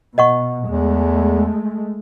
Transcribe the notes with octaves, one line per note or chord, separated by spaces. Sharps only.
B2 D#5 F#5 C#6
E2 G#3 A3